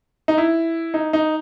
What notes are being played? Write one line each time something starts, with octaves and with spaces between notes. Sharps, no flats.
D#4
E4
D#4
D#4